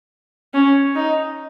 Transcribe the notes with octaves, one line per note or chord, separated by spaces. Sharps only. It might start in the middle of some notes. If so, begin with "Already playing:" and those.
C#4
D#4